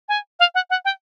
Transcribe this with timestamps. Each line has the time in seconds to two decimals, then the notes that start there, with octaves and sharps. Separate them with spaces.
0.09 G#5
0.40 F5
0.55 F#5
0.70 F#5
0.85 G5